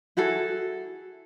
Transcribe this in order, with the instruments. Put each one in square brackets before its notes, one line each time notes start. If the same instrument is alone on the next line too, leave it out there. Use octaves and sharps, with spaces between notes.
[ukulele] E4 F#4 G#4 A4